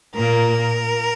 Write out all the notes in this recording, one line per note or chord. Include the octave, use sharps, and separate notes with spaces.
A#2 A#3 A#4